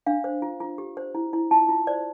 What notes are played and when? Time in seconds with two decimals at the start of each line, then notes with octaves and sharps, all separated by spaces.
0.06 D4 F5
0.24 C5
0.42 F4
0.60 F4
0.78 G4
0.97 C5
1.15 E4
1.33 E4
1.51 F4 A5
1.69 F4
1.87 C5 D5